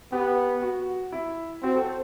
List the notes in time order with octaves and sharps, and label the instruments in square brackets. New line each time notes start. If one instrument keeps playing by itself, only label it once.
[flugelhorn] B3 [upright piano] G4
[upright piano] F#4
E4
[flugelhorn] C4 [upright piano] F#4
[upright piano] A4
C5